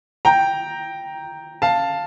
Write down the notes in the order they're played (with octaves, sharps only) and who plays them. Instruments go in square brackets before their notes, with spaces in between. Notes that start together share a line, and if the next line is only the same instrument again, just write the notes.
[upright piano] G5 A#5
F5 A5